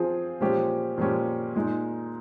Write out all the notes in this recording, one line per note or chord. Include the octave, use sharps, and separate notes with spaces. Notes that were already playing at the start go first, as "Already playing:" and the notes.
Already playing: F3 C4 F4 G#4
A#2 F3 G#3 C#4 G4
A#2 F3 G#3 C#4 G4
A#2 G#3 D#4